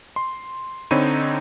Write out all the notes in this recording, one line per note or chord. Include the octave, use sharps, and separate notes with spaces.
C6
D3 C4 D#4 C#5 B5 D#7